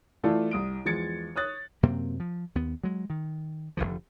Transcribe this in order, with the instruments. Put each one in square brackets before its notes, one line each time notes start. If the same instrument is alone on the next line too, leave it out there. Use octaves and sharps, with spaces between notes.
[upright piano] E3 A3 E4 F4 A4 D5
C2 D#6 D7
E2 F3 G#3 G#6 A6 C#7
C#5 D#6 F#6 A6
[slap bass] F#2 C3 A#3 C4
F3
D#2 B3
F#3 G#3
D#3
F1 A#1 D3 F3